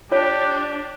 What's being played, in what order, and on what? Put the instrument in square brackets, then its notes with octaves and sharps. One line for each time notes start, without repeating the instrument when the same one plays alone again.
[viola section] D4 [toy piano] F4 C#5 [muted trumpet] G4